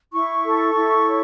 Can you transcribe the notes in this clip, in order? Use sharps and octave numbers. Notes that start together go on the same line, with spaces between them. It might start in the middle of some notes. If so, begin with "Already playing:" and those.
E4 C#6
A4
E4
C#5